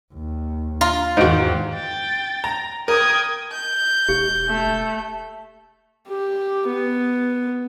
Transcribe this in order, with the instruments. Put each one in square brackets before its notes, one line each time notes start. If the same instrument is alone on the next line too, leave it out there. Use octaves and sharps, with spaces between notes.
[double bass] D#2
[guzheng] F4 [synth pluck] A#5
[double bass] E2 D#3 [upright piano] G#2 C5 D7 [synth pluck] D#4 F#4
[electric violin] G5 A6
[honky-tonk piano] A#5
[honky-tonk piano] A#4 [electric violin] G5 G#6 [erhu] D#6
[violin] G6
[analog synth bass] E1 [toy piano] G4
[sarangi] A3
[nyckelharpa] G4
B3